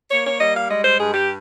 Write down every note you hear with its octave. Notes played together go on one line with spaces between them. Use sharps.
A#3 C#5
C#5
G3 D#5
F5
G#3 D#5
C5
G2 G#4
G4